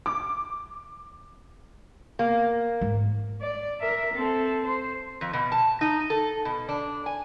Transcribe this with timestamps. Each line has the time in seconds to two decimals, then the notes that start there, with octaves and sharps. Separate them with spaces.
0.06 D6
2.19 A#3
2.81 G#2
3.41 D5
3.80 A#4 E5
4.14 C4 A4
4.65 C5
5.21 F2
5.33 B2
5.52 A5
5.81 D#4
6.10 A4
6.45 B2
6.69 D4
7.06 G#5